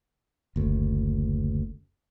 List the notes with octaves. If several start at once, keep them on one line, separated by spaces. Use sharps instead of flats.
F#1 D2